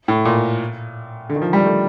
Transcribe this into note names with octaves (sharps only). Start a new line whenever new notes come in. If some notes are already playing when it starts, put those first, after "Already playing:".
A2
A#2
D3
D#3
F3
G3
A3